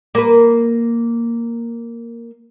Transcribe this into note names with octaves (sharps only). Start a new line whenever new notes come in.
A#3 B4